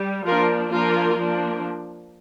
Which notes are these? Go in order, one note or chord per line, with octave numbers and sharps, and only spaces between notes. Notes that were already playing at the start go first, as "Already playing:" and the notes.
Already playing: G3
F3 A#3 D4 F4 A#4
F3 A#3 D4 F4 A#4
F3 A#3 D4